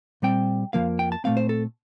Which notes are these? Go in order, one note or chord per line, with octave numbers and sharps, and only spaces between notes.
A#2 G3 C4 G5
F2 C3 F3 A#3 F5
G5
A5
A#2 A3 C4 F5
C5
A4